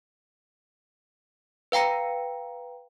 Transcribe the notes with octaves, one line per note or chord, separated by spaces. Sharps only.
B4 F5 G5 A#5 C#7